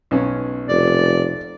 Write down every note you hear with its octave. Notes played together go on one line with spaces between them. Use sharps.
B1 C#4
F1 D5